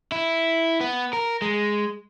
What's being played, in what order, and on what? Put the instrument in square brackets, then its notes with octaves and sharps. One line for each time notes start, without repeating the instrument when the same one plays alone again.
[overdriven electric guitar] E4
B3
A#4
G#3